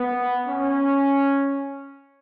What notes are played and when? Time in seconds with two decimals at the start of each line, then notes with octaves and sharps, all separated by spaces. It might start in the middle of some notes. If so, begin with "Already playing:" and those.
Already playing: B3
0.46 C#4